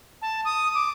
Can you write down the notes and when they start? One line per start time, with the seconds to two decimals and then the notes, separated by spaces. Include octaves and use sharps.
0.22 A5
0.45 D#6
0.75 D6